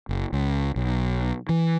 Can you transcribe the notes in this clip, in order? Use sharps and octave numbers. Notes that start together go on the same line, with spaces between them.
F#1
C#2
B1
E3